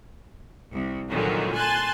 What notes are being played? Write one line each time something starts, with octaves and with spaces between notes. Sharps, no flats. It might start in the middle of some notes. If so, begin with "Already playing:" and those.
C2
A#2 D3 D#3 F3 F#3 G#3
G#5 A5 C6 F#6 A6